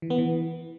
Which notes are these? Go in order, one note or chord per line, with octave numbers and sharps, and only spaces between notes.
E3
B3
E3